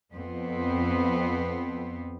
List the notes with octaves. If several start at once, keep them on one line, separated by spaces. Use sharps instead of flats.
F2 B3 C4